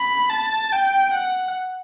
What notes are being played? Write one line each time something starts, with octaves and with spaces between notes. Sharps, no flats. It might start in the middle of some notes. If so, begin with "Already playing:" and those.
Already playing: B5
A5
G5
F#5